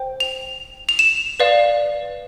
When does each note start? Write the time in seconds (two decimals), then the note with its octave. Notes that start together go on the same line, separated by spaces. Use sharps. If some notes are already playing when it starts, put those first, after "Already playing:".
Already playing: C5 G5
0.20 F7
0.89 F7
0.99 E7
1.40 B4 D5 F5